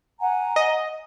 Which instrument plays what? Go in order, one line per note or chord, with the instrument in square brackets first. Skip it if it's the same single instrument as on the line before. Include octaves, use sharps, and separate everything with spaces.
[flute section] F#5 G#5 A#5
[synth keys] D#5